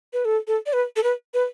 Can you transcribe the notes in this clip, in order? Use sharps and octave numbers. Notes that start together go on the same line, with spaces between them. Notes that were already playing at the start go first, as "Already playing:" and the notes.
B4
A4
A4
D5
B4
A4
B4
B4